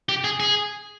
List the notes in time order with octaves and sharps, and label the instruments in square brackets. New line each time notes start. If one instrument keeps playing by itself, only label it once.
[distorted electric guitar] G4
G#4
G#4